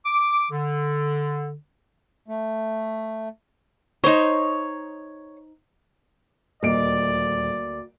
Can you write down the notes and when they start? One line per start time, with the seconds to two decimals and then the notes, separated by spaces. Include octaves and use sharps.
0.05 D6
0.50 D3
2.28 A3
4.04 D#4 C5 C#5
6.63 D#1 D2 A#3 D5 D#5 D7